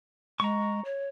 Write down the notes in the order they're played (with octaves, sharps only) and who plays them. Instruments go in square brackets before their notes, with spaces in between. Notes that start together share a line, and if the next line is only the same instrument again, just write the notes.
[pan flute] G#3 [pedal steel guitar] A#5 C#6
[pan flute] C#5